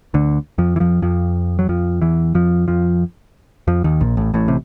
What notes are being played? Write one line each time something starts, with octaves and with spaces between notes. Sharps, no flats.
D2 D3
F2 F3
E3
F2 F3
F2 F3
F#3
F2 F3
E2 E3
F2 F3
F2 F3
F2 F3
D#2 D#3
A#1 A#2
A1 A2
A1 A2
C3